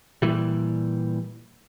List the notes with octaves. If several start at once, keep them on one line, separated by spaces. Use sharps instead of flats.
A#2 E3 G3